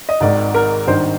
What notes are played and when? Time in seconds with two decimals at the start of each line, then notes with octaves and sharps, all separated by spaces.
0.09 D#5
0.21 G#1 G#2 D#3 D5
0.54 A#4
0.87 G#1 G2 D#3 C5